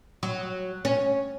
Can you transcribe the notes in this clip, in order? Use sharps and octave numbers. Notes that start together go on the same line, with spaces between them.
F#3
C#4